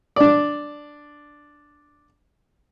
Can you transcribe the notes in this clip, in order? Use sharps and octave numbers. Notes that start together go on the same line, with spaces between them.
D4 D5